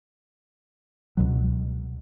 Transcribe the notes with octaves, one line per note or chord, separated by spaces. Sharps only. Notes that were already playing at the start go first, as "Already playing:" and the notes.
C#2 B2 F#3